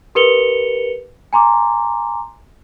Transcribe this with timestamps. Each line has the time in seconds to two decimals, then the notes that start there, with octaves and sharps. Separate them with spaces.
0.15 G4 A#4 B4 C#7 F7 G7
1.33 G#5 A#5 C6 D6